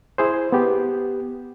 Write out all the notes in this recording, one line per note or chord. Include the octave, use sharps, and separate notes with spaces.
E4 G#4 C5
B3 G4